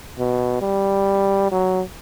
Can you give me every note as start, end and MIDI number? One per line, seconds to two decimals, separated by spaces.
0.19 0.59 47
0.62 1.49 55
1.52 1.82 54